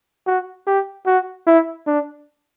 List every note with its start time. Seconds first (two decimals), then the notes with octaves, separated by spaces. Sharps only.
0.27 F#4
0.67 G4
1.07 F#4
1.47 E4
1.87 D4